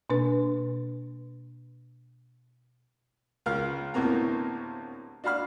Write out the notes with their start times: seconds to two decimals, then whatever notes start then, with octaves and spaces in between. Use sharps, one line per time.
0.10 B2 A#3 D4 B4
3.46 C#2 A#4 F5 F6
3.94 D2 A2 C3 A#3 B3 A#5
5.24 D4 F#4 F5 B5 F6